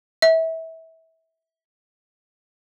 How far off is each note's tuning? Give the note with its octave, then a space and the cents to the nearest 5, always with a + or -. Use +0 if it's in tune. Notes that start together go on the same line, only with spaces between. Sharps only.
E5 -25